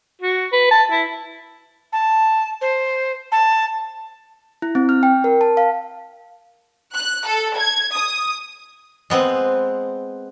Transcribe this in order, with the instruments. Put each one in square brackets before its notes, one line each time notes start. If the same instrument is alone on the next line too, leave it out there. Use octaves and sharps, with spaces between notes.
[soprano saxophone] F#4
B4
A5
E4
[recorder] A5
C5
A5
[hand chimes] E4
C4
F6
G5
A#4
A5
F5
[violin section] F#6
A4
G#6
D#6
[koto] G#3 B3 C4